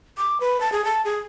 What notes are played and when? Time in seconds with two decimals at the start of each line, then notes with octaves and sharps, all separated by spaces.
0.17 D6
0.40 B4
0.61 A5
0.72 G#4
0.85 A5
1.05 G#4